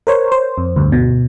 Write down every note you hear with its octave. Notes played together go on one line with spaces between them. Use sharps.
A#4 C5 C#5
C5
F2
D2 G2
B2